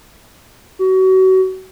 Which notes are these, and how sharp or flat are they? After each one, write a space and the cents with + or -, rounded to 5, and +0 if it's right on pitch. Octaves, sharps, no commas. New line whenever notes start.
F#4 +30